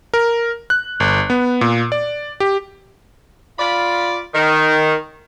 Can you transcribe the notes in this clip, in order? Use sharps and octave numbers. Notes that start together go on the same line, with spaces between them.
A#4
F#6
G1
B3
A#2
D5
G4
F4 D5 B5
D#3